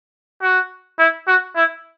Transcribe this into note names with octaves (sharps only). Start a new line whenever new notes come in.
F#4
E4
F#4
E4